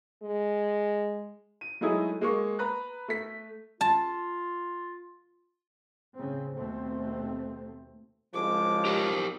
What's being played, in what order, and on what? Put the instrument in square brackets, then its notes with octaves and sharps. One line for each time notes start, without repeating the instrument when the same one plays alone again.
[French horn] G#3
[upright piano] D#7
F#3 G#3 A3 D#4 E4 G#4
G#3 A#3 C#6
B4 A#5 F#6
A3 B6
[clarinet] F4 [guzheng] A5
[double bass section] A2 C#3 C4
D#2 B2 A3 C4
[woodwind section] C2 C#3 G#3 [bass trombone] F3 [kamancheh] D6
[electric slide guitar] G4 A#4 C5